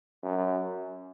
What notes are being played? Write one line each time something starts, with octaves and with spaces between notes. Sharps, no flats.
F#2